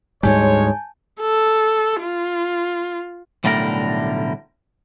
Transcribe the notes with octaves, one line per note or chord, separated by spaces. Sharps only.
D2 G#2 G3 G#3 C#5 G#5 A5 G6
A4
F4
B1 A2 D3 G3 A3 A#4